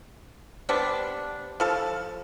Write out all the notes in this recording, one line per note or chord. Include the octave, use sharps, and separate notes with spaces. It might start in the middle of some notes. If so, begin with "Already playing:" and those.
G3 B3 C4 D4
F3 A4 A5